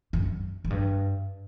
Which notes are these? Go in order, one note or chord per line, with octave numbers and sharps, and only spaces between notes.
F#2
F#2
G2